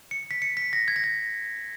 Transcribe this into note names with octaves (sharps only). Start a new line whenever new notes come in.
C#7
B6
C#7
B6
A#6
G#6
A#6
G#6